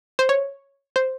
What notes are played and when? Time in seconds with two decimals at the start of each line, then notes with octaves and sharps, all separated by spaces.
0.19 C5
0.29 C#5
0.96 C5